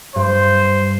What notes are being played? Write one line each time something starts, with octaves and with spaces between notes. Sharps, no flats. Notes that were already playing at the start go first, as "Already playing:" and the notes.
G2 C5